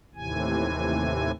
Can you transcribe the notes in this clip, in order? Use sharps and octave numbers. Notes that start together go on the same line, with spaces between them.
D#2 A2 C3 E3 G#5